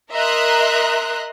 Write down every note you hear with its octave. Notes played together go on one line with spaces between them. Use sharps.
A#4 D#5 E5 A#5 C6 F#6